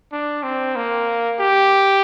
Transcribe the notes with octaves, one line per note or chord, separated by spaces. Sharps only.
D4
C4
A#3
G4